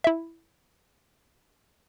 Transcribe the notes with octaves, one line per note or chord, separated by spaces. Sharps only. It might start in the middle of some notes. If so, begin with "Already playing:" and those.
E4 E5